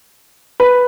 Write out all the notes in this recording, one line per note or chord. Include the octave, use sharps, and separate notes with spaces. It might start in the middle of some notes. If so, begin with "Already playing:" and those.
B4